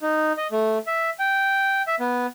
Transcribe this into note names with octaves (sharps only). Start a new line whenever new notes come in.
D#4
D#5
A3
E5
G5
E5
B3